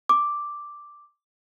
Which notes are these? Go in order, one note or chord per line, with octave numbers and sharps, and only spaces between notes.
D6